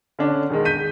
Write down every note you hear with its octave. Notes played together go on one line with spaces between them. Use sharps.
D3 C#4 D4
E1 D#3 G#3
G6 B6 D#7